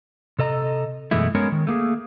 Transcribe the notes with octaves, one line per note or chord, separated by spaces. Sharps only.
C3 A4 D#5 A#5
F#2 B2 E3 G#3 A3 E4
G#3 B3 C#4 A#4 C#5
D#3
A3 A#3 G#4